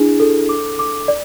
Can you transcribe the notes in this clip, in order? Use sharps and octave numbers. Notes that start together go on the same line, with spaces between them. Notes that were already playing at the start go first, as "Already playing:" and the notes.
Already playing: D4 E4 G#4
A4
D6
D6
D5